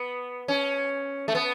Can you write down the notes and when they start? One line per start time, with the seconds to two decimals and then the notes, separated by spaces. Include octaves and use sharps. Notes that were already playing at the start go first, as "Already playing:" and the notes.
Already playing: B3
0.48 C#4
1.28 A3
1.35 B3